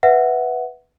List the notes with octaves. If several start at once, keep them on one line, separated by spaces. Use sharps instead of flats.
B4 E5 F#5